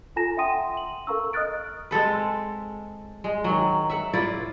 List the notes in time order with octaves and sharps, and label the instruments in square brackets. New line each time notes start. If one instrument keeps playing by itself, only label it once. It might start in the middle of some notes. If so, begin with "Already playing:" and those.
[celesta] F4 A4 G#5 A#5 A#6 E7
E5 F#5 G5 C6 D#6 D#7
F#7
A4 A#4 F5 A#5 C#6 E6
D#5 D#6 F6 F#6 A6 D7
[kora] G#3 C4 A4 B4
G#3
D#3 F#3
E5 F#5
E4 F4 B4 D5